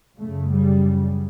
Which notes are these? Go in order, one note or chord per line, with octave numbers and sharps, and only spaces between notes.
F#2 C#3 A3
G3